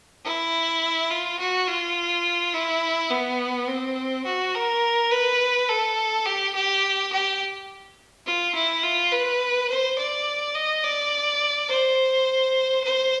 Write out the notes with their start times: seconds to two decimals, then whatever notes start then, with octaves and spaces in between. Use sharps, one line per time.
0.25 E4
1.10 F4
1.39 F#4
1.68 F4
2.54 E4
3.11 B3
3.68 C4
4.26 F#4
4.55 A#4
5.11 B4
5.69 A4
6.26 G4
6.55 G4
7.12 G4
8.26 F4
8.55 E4
8.83 F4
9.12 B4
9.70 C5
9.98 D5
10.55 D#5
10.84 D5
11.69 C5
12.84 C5